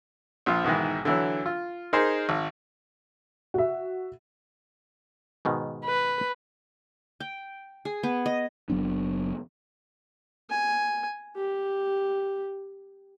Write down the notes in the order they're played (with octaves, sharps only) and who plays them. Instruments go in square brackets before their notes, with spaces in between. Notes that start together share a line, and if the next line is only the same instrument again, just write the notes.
[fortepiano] A#1 F3 F4
B1 G#2 D#3 E3
D3 E3 F#3
F4
D#4 G#4 A#4 C5
G#1
[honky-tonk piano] F#4 E5
[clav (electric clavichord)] G#2 B2 D#3
[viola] B4
[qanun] G5
G#4
B3
D#5
[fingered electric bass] F#1 F#3 B3 D4
[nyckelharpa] G#5
G4